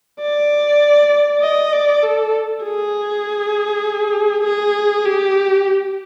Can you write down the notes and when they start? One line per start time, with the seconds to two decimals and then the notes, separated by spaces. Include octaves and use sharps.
0.21 D5
1.42 D#5
1.73 D5
2.03 A4
2.64 G#4
4.44 G#4
5.05 G4